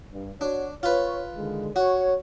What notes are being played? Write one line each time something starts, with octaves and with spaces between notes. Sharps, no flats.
G2
D4 F#4 C#5
F4 B4 C#5
D3 D#3 G#3
F#4 C#5